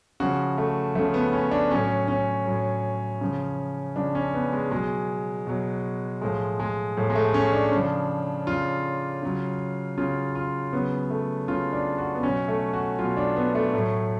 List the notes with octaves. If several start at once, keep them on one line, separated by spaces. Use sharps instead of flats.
C#3 F3 F#4
A3
C#3 F3 A3
B3
C#4
D4
A2 F#3 C#4
C#4
A2 F#3
C#3 F3
C#3 F3 D4
C#4
B3
G#3
B2 F#3 G#3
B2 F#3
A2 F3 G#3
G#3
A2 F3
G#3
A3
C#4
D4
C#3 F3
C#3 F3 F4
C#3 F#3
C#3 F#3 F4
F4
C#3 F#3 B3
A3
C#3 F#3 F4
D4
F#4
B3
B2 F#3 C#4
A3
F#4
B2 F#3 F4
D4
B3
A3
A2 F#3